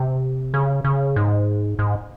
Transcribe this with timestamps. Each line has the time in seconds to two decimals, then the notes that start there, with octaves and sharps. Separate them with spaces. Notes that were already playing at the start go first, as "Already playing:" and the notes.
Already playing: C3
0.54 C#3
0.84 C#3
1.16 G#2
1.79 G#2